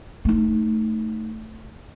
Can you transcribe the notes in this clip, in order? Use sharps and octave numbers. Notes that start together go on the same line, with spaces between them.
A3 D#4